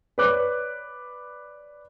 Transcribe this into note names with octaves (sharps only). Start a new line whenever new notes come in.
B4 C#5 D5 D6 F#6